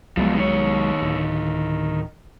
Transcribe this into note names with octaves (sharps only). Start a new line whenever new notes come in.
C2 F3 F#3 G#3 B3
D#3 C#5
D1